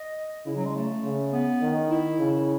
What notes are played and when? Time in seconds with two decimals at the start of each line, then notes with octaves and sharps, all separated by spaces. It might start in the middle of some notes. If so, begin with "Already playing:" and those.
Already playing: D#5
0.46 C#3 E4
0.56 F#3
0.65 G#3
0.75 A3
1.04 C#3
1.33 B3
1.62 D#3
1.90 E4
2.19 C#3